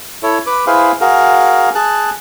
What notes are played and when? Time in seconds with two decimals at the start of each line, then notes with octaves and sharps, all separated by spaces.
0.23 E4 A4 C#5
0.46 B4 D6
0.67 E4 G#4 B4 C5 F5
1.01 F#4 G#4 A#4 F5
1.75 G#4 A5 F#6